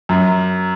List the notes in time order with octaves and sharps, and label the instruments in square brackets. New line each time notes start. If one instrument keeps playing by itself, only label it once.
[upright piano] F#2